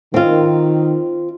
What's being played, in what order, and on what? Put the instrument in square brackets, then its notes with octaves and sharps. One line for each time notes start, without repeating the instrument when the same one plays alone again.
[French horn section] D#3 [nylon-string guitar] C4 F4